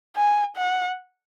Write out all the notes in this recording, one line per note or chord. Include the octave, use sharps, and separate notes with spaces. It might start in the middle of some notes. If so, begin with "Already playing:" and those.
G#5
F#5